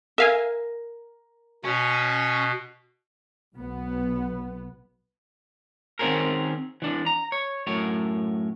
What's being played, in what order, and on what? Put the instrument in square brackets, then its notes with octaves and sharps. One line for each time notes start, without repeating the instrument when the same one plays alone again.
[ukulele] A#4 [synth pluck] E5 F5 G#5
[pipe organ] B2 [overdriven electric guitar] C#4
[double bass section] B1 B3
[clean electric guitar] D#3 C4 C#4 G#4 A#4
E3 D4
A#5
C#5
F#2 A2 C#5